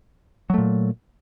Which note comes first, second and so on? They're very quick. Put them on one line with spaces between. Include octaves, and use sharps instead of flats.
F#3 A3 A#2